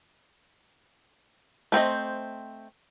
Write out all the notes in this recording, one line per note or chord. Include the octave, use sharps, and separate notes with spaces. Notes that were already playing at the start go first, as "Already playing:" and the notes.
A3 C4 C5 D#5